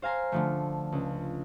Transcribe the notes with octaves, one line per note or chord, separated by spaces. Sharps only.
C5 F5 G#5 A#5 C6
D3 F3 A3
C#2